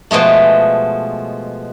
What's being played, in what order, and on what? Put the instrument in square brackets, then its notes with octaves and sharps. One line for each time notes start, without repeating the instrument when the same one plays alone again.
[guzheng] B2 F3 G#3 A3